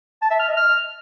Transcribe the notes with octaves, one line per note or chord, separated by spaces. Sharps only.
A5
E5
F6
D#5
F6